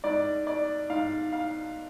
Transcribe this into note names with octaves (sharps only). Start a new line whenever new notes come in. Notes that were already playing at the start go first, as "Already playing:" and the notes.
G#2 D5
D5
G#2 F5
F5